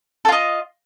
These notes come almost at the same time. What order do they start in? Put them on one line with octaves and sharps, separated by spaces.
A4 F4 D#5